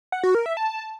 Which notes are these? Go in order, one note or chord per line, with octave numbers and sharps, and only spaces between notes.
F#5
F#4
A#4
E5
A5